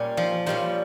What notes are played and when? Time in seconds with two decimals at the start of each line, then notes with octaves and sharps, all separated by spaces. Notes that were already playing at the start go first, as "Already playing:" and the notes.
Already playing: A#2 G3 C#4
0.17 F3
0.47 A#2 F3 G3 C#4